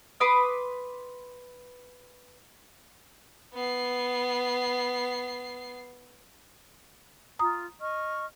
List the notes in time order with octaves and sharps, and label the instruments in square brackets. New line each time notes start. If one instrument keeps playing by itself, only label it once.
[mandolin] B4 C6 D6 D#6
[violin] B3 C7
[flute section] F4 [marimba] A#5 D#6
[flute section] D#5 C#6 F6